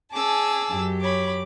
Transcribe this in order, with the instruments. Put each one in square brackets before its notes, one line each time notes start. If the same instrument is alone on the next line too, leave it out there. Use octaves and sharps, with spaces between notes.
[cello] C#4 [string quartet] G#4 A5 [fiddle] D6 E6
[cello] F#2 G4
[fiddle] C#5 B5 [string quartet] D6